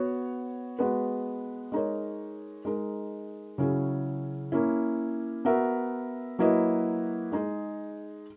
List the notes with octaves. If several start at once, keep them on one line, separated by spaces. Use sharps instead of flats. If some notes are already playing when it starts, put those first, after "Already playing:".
Already playing: B3 F#4 C#5
G#3 B3 F#4 B4
G#3 D#4 A#4 C#5
G#3 D#4 A#4
C#3 F#3 C#4 E4 G#4
A#3 C#4 E4
B3 F#4 A#4 E5
F#3 A#3 E4 B4 D#5
G#3 D#4 G#4